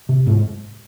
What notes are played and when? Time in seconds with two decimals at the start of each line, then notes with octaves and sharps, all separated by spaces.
0.09 C3
0.26 G#2